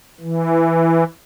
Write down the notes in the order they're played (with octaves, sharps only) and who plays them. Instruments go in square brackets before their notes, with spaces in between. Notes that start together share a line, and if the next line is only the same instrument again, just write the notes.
[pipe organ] E3